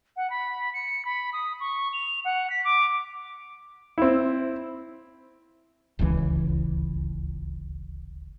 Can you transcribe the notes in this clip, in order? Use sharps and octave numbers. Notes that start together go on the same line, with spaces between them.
F#5
B5
C#7
B5
D#6
C#6
F7
F#5
B6
D6
C4 E4
D1 G#1 C#2 E3